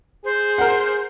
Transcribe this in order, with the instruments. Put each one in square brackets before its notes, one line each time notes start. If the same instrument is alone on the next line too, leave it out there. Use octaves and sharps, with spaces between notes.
[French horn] G#4 [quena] C5
[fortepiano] A#4 F#5